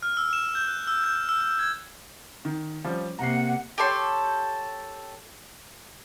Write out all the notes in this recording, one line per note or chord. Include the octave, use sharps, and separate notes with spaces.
F6
E6
E7
G6
F#6
E6
G6
E6
E6
G#6
D#3
F3 G3 C#4
C3 A#3 F#5 A#5 C7
G4 A4 C#5 C6